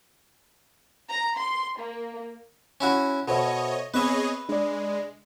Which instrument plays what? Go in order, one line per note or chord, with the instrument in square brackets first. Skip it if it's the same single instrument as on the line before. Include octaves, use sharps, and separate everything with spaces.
[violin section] A#5
C6
A#3
[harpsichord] C#4 E4 F#4
[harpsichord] B2 [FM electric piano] A4 C5 E5 [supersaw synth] C#5 D#5
[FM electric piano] B3 C4 [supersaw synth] G#4 C#5 D#5 [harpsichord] B4 E5
[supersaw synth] G#3 [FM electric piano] D4 D5